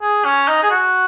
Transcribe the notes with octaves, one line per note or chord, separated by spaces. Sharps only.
G#4
C#4
D#4
G#4
F#4